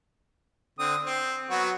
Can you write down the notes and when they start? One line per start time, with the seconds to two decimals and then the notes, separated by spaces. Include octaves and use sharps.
0.79 D3 C4 D#6
1.06 C4 C5
1.50 F#3 B3 F#4